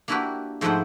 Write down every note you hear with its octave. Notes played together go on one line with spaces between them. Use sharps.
A#3 D4 E4 F#4 G4 B4
G#2 F3 A3 E4 C5 F#5